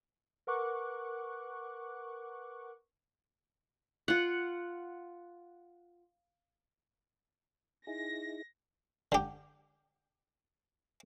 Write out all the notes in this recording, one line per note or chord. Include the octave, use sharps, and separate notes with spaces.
A#4 B4 F#5 C#6 D6 F#6
F4 F#5
D#4 E4 G#4 A#6
D3 G4